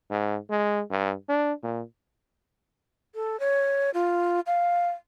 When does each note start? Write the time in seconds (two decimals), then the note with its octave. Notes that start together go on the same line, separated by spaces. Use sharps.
0.10 G#2
0.50 G#3
0.90 G2
1.29 D4
1.63 A#2
3.15 A4
3.40 C#5
3.94 F4
4.47 F5